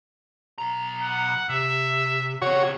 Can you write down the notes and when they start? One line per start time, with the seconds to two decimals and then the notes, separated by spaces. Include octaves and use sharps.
0.58 B1 A#5
1.02 F#5
1.49 C3 E5
2.42 C#3 C4 F#4 C#5